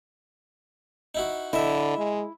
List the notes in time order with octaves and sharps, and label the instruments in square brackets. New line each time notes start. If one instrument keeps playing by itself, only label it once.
[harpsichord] D#4 E4 F#4
[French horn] D3 [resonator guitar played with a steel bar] E4 [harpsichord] D#5 E5
[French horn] G#3